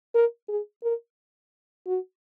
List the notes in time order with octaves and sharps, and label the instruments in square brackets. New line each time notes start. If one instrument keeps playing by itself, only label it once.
[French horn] A#4
G#4
A#4
F#4